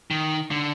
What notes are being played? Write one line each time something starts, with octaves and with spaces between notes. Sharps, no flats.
D#3
D3